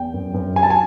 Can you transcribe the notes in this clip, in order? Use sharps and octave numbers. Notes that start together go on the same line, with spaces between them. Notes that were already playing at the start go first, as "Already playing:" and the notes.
Already playing: E2 G5
F#2
F#2
F#3 G#5
A5
G#5